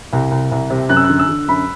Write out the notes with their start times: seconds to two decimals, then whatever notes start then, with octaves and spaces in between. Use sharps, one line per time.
0.13 C2
0.31 C2
0.51 C2
0.70 C3
0.89 F#2 F#6
0.96 E6
1.04 F#6
1.09 D3
1.19 E6
1.29 D3
1.48 F#2 B5